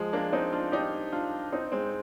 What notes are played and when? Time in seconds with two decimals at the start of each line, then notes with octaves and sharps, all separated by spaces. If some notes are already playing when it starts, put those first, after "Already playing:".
Already playing: F3 G#3
0.13 A#3 D4
0.32 C4 D#4
0.53 D4 F4
0.72 D#4 G4
1.12 D4 F4
1.52 C4 D#4
1.72 G#3 C4